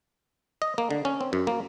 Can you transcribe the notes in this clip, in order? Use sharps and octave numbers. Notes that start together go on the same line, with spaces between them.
D#5
A#3
D3
C#4
C4
F#2
A#3